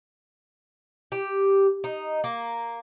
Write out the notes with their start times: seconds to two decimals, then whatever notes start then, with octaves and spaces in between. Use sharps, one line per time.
1.12 G4
1.84 D#4
2.24 A#3